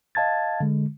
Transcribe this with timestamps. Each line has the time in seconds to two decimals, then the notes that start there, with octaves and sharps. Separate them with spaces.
0.15 D#5 F5 A5 G#6 A6
0.61 D3 G#3